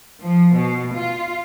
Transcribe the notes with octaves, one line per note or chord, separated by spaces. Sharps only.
F3
B2
F4